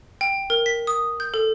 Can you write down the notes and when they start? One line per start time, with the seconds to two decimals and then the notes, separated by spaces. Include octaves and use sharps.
0.21 G5
0.50 A#4
0.66 B6
0.87 D#6
1.20 G6
1.34 A4